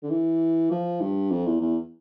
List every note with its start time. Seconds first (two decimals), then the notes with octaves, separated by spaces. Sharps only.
0.03 D3
0.10 E3
0.71 F3
1.01 G2
1.31 F2
1.47 E2
1.61 E2